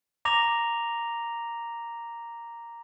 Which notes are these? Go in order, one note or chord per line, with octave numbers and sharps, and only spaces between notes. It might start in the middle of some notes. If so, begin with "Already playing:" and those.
A#5 D6 A#6 F7